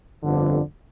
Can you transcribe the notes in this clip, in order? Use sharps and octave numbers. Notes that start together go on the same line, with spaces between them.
G1 F2 D3